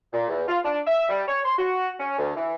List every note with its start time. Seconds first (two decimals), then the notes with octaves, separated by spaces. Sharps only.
0.13 A#2
0.29 E2
0.48 F4
0.65 D4
0.87 E5
1.09 G3
1.28 C#5
1.45 C6
1.58 F#4
1.99 C#4
2.18 D2
2.36 E3